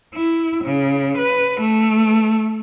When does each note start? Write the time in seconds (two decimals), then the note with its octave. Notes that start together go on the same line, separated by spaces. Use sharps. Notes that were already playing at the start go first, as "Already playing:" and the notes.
0.14 E4
0.65 C#3
1.18 B4
1.61 A3